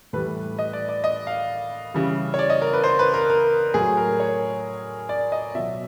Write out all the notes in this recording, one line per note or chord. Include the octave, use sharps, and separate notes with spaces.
A2 E3 G3 B4
D#5
D5
D5
D#5
F5
C#3 E3 G3
C#5
D5
D#5
A#4
B4
C5
B4
A#4
A#4
A2 F#3 G#4
A#4
C#5
D5
D#5
B2 F#3 E5